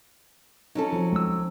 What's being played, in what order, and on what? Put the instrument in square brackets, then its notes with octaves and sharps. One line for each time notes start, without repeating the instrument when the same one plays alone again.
[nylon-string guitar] F#3 C#4 A4 [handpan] D#4
[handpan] F3 C4
[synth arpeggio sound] C#2 E6